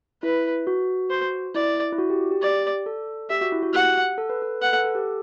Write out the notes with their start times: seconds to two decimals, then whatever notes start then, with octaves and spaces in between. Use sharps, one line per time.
0.23 E4 B4
0.67 F#4
1.10 C5
1.55 E4 D5
1.92 E4
1.98 F#4
2.10 G4
2.31 G4
2.42 G4 D5
2.86 A4
3.30 G4 E5
3.41 F#4
3.52 E4
3.63 F#4
3.74 G4 F#5
4.18 A4
4.30 B4
4.42 A4
4.61 B4 F#5
4.73 A4
4.84 A4
4.95 G4